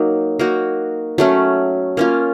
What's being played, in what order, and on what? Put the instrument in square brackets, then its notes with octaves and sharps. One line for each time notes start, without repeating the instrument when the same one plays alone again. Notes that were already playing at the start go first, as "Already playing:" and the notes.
Already playing: [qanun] F#3 A#3 D#4
A#3 D#4 F#4
F#3 A3 C#4
A#3 C#4 F4